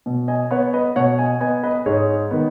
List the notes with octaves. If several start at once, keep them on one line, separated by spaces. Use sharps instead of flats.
B2
D#5 G#5
B3 C#5 F#5
B4 D#5
B2 C#5 F#5
D#5 G#5
B3 D#5 G#5
B4 D#5
G#2 G#4 C#5
D#3 B3